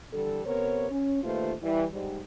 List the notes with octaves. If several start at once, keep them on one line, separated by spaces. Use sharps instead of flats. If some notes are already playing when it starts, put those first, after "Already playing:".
D3 E3 G3 A4
C3 B3 A#4 C5 C#5
C#4
D#2 A#2 A3 F4 B4 C5
E3 G3
G#2 G3